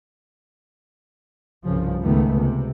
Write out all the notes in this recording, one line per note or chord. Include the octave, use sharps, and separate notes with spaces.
C2 G2 C#3 F3
C#2 G#2 D#3 A3 B3
C3